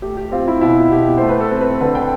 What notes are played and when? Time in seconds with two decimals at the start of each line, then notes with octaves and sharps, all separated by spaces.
0.02 A3 G4
0.17 G4
0.32 C4 F4
0.48 E4
0.61 B2 E4
0.91 B2 G4
1.18 A3 C5
1.29 B4
1.40 A4
1.51 C4
1.61 B4
1.80 D3 B4
1.95 G5